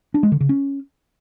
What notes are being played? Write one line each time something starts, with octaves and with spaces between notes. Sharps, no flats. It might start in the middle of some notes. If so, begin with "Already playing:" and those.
D4
G#3
D3
C#3
C#4